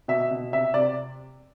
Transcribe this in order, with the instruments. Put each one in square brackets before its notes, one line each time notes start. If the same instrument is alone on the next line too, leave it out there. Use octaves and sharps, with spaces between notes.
[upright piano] B2 E5
B2
C3 E5
C3 D5